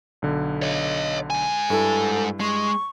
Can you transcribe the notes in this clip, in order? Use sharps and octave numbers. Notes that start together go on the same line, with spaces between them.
B1 D3
C#5 D#5
G#2 G#5
G2 E4 A4
G#3 C#6